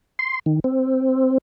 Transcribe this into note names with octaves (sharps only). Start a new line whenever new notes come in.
C6
D#3
C4